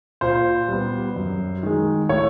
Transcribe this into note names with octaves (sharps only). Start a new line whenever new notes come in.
A#2 C5
G3 B3
F#2
D#3 G#3
A2 C#5